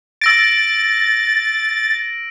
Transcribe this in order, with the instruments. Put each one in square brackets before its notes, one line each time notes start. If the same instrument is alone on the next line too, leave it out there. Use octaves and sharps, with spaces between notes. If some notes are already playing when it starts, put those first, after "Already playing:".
[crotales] E6 A#6 D7 [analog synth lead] A6